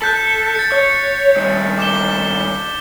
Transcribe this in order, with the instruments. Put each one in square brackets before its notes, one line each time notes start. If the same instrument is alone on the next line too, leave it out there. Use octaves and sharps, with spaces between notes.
[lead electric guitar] A4 [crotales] F#6 G6 B6
[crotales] A6 C#7
[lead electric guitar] C#5
G2 D#3
[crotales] D6 E7 G7